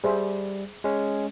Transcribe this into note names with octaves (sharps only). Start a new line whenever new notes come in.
G3 G#4 C5 E5
G#3 C#4